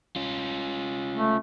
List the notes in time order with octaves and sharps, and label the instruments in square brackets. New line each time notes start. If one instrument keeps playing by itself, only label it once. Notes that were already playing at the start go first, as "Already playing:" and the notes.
[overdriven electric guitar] C#4 F4
[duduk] A3